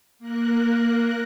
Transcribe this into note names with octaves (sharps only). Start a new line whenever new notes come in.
A#3 A#4 F#6